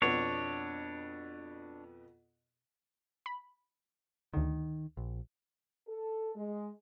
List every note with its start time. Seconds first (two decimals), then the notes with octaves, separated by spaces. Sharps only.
0.02 F2 B2 B3 D4 C#5
3.26 B5
4.34 D2 D3 D#3
4.97 A#1
5.88 A4
6.35 G#3